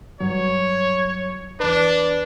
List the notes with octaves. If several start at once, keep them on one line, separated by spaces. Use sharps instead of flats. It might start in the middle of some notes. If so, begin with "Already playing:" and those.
G2 F#3 C#5
E2 D4 B4